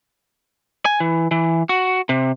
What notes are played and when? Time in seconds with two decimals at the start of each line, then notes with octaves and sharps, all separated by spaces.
0.85 G#5
1.00 E3
1.31 E3
1.69 F#4
2.09 C3